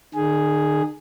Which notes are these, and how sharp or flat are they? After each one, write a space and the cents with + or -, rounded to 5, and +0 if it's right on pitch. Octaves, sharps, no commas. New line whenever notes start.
D#3 -45 G#4 +0